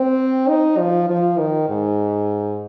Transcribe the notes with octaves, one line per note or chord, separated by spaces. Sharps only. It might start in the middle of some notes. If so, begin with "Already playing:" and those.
Already playing: C4
D#4
F3
F3
D#3
G#2